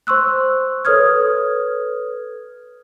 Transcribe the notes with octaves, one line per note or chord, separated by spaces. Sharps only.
C5 C6 C#6 E6 F#6
A4 B4 C#5 D#6 F6 G#6